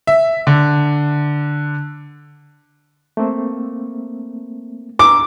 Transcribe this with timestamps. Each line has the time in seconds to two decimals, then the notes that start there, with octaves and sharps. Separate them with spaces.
0.07 E5
0.47 D3
3.17 A3 A#3 C4
4.99 A#5 D6 E6